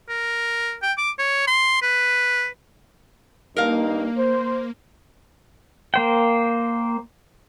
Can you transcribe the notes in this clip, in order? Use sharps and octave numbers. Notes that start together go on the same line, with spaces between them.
A#4
G5
D6
C#5
C6
B4
G2 A#3 D4 D#4 A#4 F5
C5
A#3 C5 G5